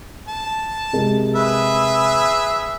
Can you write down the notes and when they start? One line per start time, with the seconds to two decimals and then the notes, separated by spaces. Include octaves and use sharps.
0.28 A5
0.93 C3 G#3 A#4
1.35 G#4 B4 E5